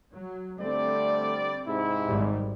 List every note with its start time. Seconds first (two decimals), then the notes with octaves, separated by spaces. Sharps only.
0.13 F#3
0.60 D3 G3 A3 C4 D5
1.67 G#2 C3 E4
2.07 G#1 G3